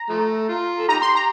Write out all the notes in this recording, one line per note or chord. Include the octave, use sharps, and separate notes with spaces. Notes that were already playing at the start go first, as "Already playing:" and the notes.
Already playing: A#5
F3 A3
F4
A4
D#4 G4 A#5
C6
A#5